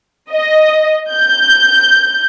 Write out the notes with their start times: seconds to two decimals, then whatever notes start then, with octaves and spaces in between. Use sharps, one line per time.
0.32 D#5
1.11 G6